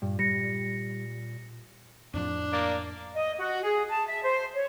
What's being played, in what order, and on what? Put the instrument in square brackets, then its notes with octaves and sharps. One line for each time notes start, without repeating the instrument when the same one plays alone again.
[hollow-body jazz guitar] G2 [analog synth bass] A#2
[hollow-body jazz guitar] G3 [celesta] A#6 C#7
[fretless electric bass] F2 A2 F3 [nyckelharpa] D4
[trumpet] A#3 [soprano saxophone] D5
[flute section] D#5
F#4
G#4
A5
E5
C5
C#5